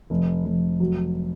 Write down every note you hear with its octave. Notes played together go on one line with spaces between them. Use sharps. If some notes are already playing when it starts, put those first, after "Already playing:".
F1
F1
F#3